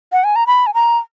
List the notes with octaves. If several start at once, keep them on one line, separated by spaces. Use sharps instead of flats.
F#5
G#5
A#5
B5
G#5
A#5